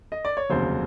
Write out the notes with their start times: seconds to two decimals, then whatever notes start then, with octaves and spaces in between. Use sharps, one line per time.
0.12 D#5
0.25 D5
0.37 C#5
0.50 F1 D#2 C#3 F#3 C5